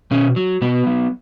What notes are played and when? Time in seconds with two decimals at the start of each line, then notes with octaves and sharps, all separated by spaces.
0.11 B2 C#4
0.36 F#3
0.62 B2 B3
0.86 F#3